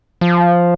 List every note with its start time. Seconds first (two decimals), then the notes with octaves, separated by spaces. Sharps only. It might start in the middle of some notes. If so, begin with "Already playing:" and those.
0.21 F3